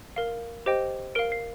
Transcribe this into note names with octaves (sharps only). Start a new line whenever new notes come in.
A#4 F5
G4 C5 D#5 G5
A#4 F5 D7
C7